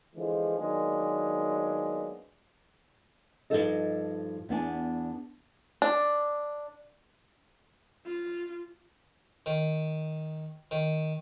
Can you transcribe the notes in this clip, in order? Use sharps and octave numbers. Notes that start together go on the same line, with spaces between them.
D3 E3 F3 G#3
D#3 F#3 G#3 A#3 B3 D4
G2 C#3 F3 D#4 A4 D#5
E2 B3 D4 G#5
D4
F4
D#3
D#3